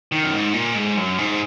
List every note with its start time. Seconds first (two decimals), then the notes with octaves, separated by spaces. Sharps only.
0.12 D#3
0.24 F#2
0.33 G#2
0.54 A#2
0.75 G#2
0.97 F#2
1.18 G#2